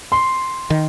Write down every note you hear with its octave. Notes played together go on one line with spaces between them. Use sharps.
C6
D#3